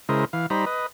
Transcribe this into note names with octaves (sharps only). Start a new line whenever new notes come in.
C#3 G#3 E4 A#4 C5 D#5
E3 F5
G3 D#4 C5 A#5 B5
B4 D#5